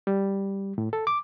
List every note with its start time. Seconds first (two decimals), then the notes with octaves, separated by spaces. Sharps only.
0.07 G3
0.78 A2
0.93 A4
1.07 D6